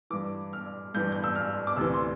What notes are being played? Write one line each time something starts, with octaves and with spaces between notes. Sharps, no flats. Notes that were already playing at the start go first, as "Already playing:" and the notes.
G2 E3 D6
F6
G2 E3 G6
G6
E6
F6
D6
D2 C3 E3 E6
C6